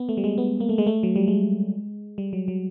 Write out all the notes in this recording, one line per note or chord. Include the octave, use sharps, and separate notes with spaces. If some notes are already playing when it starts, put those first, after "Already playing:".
Already playing: B3
A3
G3
G#3
B3
A#3
A3
G#3
A3
F#3
G3
G#3
G3
F#3
F#3